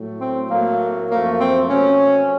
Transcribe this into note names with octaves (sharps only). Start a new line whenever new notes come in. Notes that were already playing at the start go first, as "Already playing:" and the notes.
Already playing: A2 F#3 A3
C4
A2 F#3 A3 A#3
F#2 F3 A3 A#3
C4
C3 F#3 A3 C#4